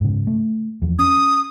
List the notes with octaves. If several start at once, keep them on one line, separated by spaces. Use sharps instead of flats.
G#2 C#3
A3
E2 F3
C#4 D#6